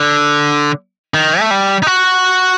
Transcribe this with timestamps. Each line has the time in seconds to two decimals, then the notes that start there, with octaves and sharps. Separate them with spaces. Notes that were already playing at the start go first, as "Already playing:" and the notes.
Already playing: D3
1.14 D#3
1.40 A3
1.51 G3
1.83 D#4
1.87 F#4